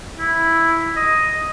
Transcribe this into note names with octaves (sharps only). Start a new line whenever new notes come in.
E4
D#5